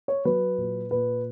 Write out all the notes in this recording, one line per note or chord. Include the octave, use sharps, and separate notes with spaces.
C#5
F#3 B4
A#2
A#2 B4